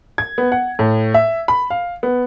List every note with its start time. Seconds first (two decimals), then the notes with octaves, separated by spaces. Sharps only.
0.18 G#6
0.38 B3
0.52 F#5
0.79 A2
1.14 E5
1.48 B5
1.70 F5
2.03 B3